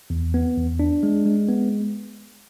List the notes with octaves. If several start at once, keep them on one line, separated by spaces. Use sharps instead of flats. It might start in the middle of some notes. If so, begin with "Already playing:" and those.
E2
B3
E2
D4
G#3
G#3
B3